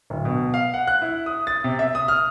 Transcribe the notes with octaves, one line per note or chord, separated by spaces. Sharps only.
D1
B2
F5
F#5
F#6
E4
D#6
A6
C3
E5
D#6
F6